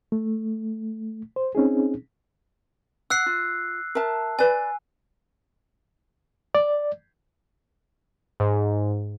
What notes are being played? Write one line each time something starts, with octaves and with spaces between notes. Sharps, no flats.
A3
C5
C4 C#4 D#4 G#4
F#5 E6 F#6 C7
F4
A#4 E5 A5
B4 D5 G#5
D5
G#2